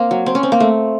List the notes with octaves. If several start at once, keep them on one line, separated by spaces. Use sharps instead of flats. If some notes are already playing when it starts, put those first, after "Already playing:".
Already playing: A#3 C4
F#3
C4
C#4
C4
A#3
A3